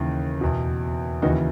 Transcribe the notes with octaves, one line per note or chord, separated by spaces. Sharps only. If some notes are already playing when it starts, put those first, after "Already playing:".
Already playing: D#2 C#3 E3
E2 B2
D#2 C#3 E3 D#4 F#4